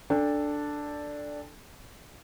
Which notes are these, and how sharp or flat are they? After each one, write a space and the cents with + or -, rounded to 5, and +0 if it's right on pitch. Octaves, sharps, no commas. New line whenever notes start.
D4 +0 A4 +0 G5 +30